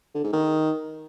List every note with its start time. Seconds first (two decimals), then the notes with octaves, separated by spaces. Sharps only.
0.15 D3
0.24 G#2
0.33 D#3